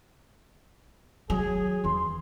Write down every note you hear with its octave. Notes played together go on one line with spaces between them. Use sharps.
F#3 G#4
E2 E3 C6